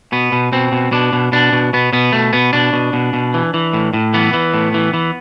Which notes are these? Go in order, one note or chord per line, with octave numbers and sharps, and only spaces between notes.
B2 B3
B2
B2 C4
B2
B2 D4
B2
B2 D4
B2
B2 B3
B2 B3
B2 A3
B2 B3
B2 D4
B2
B2
B2
E3
E3
A2
A2
E3 B3
E3
A2
E3
E3